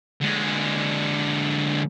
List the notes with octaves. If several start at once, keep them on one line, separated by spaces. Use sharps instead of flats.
D3 G#3